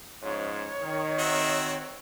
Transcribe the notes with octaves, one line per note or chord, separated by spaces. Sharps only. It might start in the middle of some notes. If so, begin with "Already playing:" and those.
G#2 F3 C#4 C#5
D#3
C4 F#4 E5